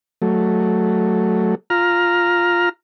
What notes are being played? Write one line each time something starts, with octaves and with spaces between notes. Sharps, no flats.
F#3 A3
F4 A#5 F6